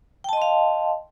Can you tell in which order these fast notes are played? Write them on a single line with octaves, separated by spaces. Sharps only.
G5 A5 D#5 C6 F5